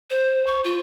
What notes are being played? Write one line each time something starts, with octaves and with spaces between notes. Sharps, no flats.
C5
C#6
F4